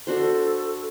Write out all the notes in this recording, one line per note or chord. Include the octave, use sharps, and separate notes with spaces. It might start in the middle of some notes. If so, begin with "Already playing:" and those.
D4 F#4 A4 C5